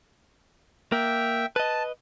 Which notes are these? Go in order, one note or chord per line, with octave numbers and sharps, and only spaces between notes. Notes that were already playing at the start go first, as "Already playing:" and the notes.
A#3 E5 G5
B4 D#5 A5